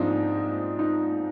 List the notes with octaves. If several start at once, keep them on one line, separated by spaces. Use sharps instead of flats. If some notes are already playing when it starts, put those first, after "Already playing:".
Already playing: G#2 F3 G#3 C4 D4 D#4 F4
D#4